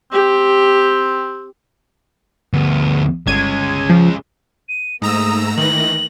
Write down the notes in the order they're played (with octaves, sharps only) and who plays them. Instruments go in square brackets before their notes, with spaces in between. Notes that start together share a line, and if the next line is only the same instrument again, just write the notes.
[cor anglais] C4 [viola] G4
[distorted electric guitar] D2 B3
[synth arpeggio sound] G1 G#6 D#7 [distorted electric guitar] G#3 C#4
[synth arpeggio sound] F3
[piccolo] D#7
[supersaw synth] G#2 A#5 E6 [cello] A3 A#3 [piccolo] D#6
[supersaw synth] D#3 E3 A#6 [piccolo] F#7